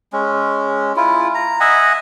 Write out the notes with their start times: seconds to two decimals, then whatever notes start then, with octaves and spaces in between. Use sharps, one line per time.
0.13 G#3 C#4
0.96 E4 F4
1.35 A#5
1.60 D#5 E5 F#5 G#5